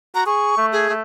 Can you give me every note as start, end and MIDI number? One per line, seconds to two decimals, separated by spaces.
0.15 0.22 66
0.15 0.24 82
0.26 0.54 68
0.26 0.66 85
0.57 0.86 57
0.72 0.93 68
0.90 1.02 57